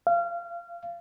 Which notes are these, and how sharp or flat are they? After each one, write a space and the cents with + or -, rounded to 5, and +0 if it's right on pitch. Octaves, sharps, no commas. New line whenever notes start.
F5 -25